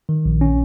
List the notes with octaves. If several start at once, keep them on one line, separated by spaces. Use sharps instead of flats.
D#3
A#1
C#4